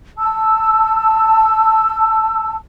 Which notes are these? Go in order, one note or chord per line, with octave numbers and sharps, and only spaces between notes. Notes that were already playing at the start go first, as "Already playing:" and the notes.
A5 E6